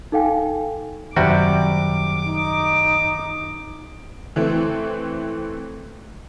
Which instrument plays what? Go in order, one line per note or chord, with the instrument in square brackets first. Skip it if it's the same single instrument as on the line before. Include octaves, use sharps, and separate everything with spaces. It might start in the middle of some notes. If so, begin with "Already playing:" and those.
[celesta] D#4 A4 F5 G5 G#5
[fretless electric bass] F#2 D#3 [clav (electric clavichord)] C3 G3 F#4 [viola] D6
[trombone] D#4
[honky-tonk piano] E3 A3 C4